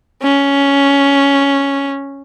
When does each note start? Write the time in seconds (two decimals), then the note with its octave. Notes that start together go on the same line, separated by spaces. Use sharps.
0.23 C#4